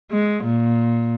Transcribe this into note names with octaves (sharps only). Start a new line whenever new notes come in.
G#3
A#2